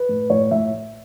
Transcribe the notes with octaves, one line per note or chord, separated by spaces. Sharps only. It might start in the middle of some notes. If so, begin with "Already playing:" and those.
Already playing: B4
A2
A2 C#5
A2 E5